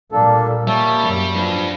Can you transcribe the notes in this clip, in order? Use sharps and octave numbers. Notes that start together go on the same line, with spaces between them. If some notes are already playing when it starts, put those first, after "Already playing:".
A#2 G3 A#3 D4 A4
G3 A#3 C#5 E5 A5
F#2 G3
F3 D4 B4